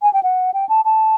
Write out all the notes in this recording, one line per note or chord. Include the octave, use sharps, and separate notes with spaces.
G#5
G5
F#5
G5
A5
A5